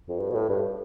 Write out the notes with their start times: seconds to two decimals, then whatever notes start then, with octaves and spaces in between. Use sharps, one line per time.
0.09 F2
0.20 G2
0.30 B2
0.35 A2
0.49 G2